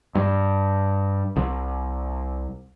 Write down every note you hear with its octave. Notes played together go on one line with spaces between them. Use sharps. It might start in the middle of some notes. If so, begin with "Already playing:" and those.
G2
C2